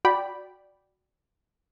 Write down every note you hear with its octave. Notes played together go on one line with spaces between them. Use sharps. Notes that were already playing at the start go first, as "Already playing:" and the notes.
F#4 D5 G5 B5